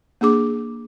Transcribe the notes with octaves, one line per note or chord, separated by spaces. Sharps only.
A#3 D4 G#4 D6